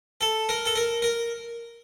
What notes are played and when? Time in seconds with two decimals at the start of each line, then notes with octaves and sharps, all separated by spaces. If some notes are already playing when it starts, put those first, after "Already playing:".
0.21 A4
0.49 A#4
0.65 A4
0.76 A#4
1.02 A#4